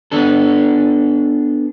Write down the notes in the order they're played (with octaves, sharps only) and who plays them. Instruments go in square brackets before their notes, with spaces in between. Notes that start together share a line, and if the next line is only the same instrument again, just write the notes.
[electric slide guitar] B3 D4 A4